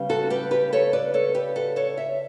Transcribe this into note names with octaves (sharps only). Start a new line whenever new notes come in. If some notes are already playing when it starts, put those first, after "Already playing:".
Already playing: C#3 G3 B3
F#4 A4
G4 B4
G4 B4
A4 C#5
B4 D5
A4 C#5
G4 B4
F#4 A4
A4 C#5
C#5 E5